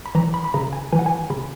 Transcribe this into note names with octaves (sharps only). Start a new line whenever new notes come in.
B5
E3 A#5
B5
B5
C#3 A#5
G#5
E3 G#5
F#5
G#5
C#3 B5